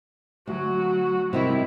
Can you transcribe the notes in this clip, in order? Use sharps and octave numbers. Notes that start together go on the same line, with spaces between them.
D2 F#3 F#4
C3 D#3 G3 E4